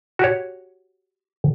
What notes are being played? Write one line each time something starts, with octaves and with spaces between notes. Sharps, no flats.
F#4 G4 C#5